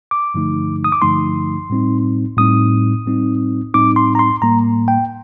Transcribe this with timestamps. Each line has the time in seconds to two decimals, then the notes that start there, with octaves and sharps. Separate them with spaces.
0.11 D6
0.34 G2 D3 F3 A3 D#4
0.84 D#6
0.92 D6
1.02 G2 D3 F3 A3 D#4 C6
1.70 A2 G3 C4 D#4
2.37 A2 G3 C4 D#4 D#6
3.06 A2 G3 C4 D#4
3.74 A2 G3 C4 D#4 D6
3.96 C6
4.15 A#5
4.19 C6
4.42 A2 G3 A#3 A#5
4.88 G5